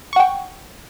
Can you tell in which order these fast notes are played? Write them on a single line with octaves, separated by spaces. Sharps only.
C#6 F#5 G5